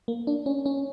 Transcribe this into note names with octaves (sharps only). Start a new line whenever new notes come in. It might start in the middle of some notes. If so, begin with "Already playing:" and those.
A#3
D4
C#4
C#4